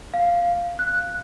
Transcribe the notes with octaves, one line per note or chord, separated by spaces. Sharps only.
F5
F#6